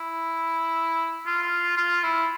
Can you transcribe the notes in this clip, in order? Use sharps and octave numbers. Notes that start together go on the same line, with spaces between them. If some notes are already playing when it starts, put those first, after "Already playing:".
Already playing: E4
F4
F4
E4